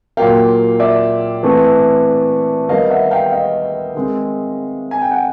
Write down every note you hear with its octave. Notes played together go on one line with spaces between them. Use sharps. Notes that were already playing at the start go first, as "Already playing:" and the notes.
A#2 F#3 A#3 F5 G5
D5 E5
E3 A3 C4
D#3 G3 B3 D#5 F5
E5 F#5
F5 G5
D#5 F5
D#3 G#3 C4
G#5
G5
F#5